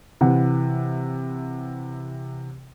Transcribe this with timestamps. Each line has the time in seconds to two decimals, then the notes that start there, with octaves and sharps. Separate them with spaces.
0.21 C3 E3 F#5